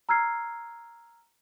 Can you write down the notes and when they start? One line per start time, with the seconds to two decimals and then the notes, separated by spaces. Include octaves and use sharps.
0.09 A#5 E6 F6 G#6 C7